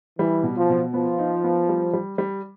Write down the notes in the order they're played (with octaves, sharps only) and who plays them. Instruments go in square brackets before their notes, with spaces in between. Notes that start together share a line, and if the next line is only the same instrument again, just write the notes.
[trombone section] E3 [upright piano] G3
[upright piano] B2
[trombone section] F3
[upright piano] B2
[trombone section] F3 [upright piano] B3
[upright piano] D#4
B3
G3
G3
G3